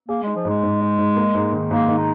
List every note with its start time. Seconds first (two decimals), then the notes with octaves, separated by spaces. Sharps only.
0.08 A#3 G#4
0.23 G#3 D#4
0.36 F3
0.45 G#2 G#3
0.63 G#2
0.81 D#4
0.98 G#2
1.16 A#3
1.35 G#2
1.53 D#3
1.70 G#2 A#3
1.88 D#3
1.98 D#4